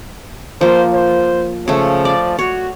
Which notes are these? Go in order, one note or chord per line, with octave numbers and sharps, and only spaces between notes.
F3 A#3 C5
C5
C#3 F3 A3
D5
F#4 C#5